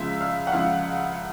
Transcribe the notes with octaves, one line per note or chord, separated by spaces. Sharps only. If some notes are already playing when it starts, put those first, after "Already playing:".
Already playing: C#2 C#3 F3 G#3 E5
F5
F#5
C#2 C#3 F3 G#3 F5